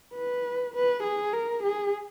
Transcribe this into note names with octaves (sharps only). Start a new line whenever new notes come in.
B4
B4
G#4
A#4
G#4